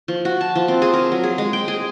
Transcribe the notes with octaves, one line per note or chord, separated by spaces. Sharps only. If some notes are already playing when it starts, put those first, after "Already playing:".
F3
F#4
A5
F3
C4
G#4
A#4
F#3
G#4
G#3
G5
G#4